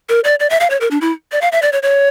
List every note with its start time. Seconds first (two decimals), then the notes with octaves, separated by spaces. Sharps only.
0.09 A#4
0.24 D5
0.40 D5
0.50 E5
0.60 F5
0.70 C#5
0.81 A#4
0.91 D4
1.01 E4
1.32 D5
1.41 F5
1.52 E5
1.62 D5
1.73 C#5
1.83 C#5